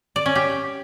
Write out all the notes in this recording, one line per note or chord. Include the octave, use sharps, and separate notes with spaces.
D5
C#4
G4